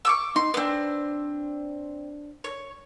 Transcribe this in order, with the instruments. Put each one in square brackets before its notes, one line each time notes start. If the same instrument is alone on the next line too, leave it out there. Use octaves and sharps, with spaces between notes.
[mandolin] C#6 D6 E6
[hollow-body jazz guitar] D#4 [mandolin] C6
[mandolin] B3 C4 [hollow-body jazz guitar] D4 B4
[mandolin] C#5